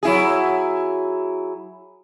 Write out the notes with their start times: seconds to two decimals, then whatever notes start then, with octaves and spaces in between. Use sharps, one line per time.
0.03 F#3 E4 G#4